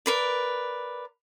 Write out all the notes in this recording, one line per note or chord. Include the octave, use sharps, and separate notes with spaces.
A#4 B4 D5